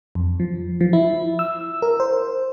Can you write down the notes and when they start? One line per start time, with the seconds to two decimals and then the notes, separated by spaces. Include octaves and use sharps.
0.15 F2
0.40 F3
0.81 F3
0.93 E4
1.39 E6
1.82 A#4
2.00 C5